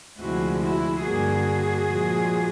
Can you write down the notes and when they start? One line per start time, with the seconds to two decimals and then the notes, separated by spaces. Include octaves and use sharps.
0.18 D2 C3 F3 G#3 E4 F#4
0.61 E4 F#4
1.02 G2 D3 G3 A#3 F#4 G#4
1.87 A#2 F3 G#3